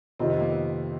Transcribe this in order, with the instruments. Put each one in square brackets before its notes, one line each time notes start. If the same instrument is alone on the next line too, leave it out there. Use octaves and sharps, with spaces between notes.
[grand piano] F2 C3 D#3 [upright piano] C4
[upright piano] B3
A#3
B3